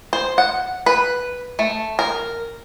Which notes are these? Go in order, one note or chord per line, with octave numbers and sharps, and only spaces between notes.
C5
F#5
B4
A3
A#4